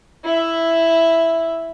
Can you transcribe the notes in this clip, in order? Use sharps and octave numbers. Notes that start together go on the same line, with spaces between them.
E4 E5